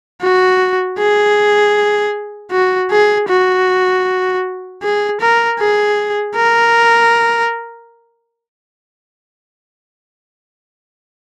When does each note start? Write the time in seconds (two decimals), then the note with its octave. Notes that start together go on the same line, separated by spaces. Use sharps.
0.22 F#4
0.99 G#4
2.52 F#4
2.91 G#4
3.29 F#4
4.83 G#4
5.21 A#4
5.60 G#4
6.36 A#4